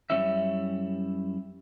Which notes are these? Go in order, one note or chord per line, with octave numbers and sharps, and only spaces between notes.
F#2 G3 C#4 E4 E5